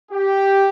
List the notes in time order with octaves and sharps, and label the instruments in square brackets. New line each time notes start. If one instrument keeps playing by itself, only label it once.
[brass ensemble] G4